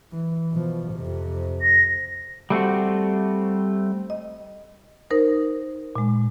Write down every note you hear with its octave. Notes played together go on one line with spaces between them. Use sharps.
E3
B2 F3
F2 C3
A#6
G3 A3 C4 F#4
D#5
D#4 A#4 C5
A#2 G#3